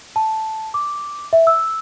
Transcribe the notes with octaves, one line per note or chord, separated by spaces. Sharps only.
A5
D6
E5
E6